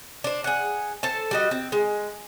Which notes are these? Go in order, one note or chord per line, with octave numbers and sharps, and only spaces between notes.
D4 C5
G#4 F#5
A4 C5 A5
G3 F#4 D#5
C4
G#3